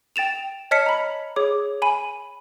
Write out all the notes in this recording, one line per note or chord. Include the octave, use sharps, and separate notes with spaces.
G5 A6 E7 F7
C#5 D#5 A5 F6 B6 C#7
A#5 B5
G#4 C#5 D6
G#5 B5 D#7